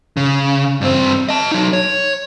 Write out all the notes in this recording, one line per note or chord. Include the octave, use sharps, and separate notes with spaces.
C#3
G2 C4
D#5 A5
F#3 D#4
C#5